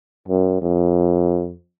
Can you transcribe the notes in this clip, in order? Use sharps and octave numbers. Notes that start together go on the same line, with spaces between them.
F#2
F2